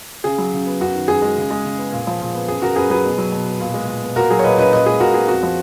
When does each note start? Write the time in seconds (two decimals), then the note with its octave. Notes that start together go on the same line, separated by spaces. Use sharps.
0.24 C#3 G#4
0.38 F#3
0.53 C#3
0.66 B3
0.80 F#2 F#4
0.95 D#3
1.08 F#2 G#4
1.22 G#3
1.37 C#3
1.50 G#3
1.65 C#3
1.78 B3
1.92 A#2
2.07 F3
2.21 A#2
2.34 B3
2.48 F#2 G#4
2.62 C#3 F#4 A#4
2.76 F#2 G#4 B4
2.90 F#3 G#4 B4
3.05 B2
3.18 F#3
3.32 B2
3.47 B3
3.60 A#2
3.74 G#3
3.88 A#2
4.03 B3
4.16 A#2 F#4 A#4
4.30 F#3 G#4
4.39 C#5
4.44 A#2 B4 D#5
4.58 C#4 B4 D#5
4.73 A#2 B4 D#5
4.86 G#3 G#4 B4
5.00 A#2 F#4 A#4
5.14 B3 G#4
5.28 F2 F#4
5.43 F3